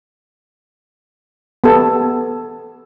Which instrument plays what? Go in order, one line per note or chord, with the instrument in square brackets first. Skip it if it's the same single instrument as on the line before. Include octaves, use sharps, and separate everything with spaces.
[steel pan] B3 G4 A4